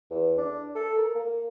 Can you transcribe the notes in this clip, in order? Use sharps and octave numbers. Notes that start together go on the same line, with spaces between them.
E2
D4
A4
A#4
A#3